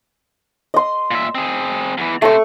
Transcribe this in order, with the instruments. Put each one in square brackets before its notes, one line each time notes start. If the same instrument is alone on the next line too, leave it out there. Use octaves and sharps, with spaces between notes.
[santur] D#5 C6
[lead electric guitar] A#2 E5
C4 G#4
E2 E3
[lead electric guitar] C3 C5 [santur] A3 C#6